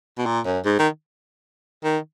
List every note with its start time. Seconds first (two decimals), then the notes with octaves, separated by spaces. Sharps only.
0.18 B2
0.26 A#2
0.45 F#2
0.65 G#2
0.79 D#3
1.84 D#3